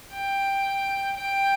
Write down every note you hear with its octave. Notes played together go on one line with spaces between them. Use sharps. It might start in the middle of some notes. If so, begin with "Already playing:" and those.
G5
G5